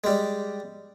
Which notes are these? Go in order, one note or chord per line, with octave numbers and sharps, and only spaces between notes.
G3 G#3